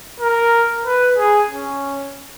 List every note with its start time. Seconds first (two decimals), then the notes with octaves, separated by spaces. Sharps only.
0.20 A#4
0.85 B4
1.18 G#4
1.50 C#4